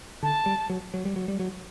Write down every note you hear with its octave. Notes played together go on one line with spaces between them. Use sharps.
D3 A5
G3
F#3
F#3
G3
F#3
G3
F#3